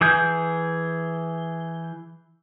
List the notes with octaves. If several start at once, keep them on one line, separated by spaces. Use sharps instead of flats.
E3 G#4 G6